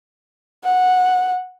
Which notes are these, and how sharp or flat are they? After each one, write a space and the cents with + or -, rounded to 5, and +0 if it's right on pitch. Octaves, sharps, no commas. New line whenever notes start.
F#5 -10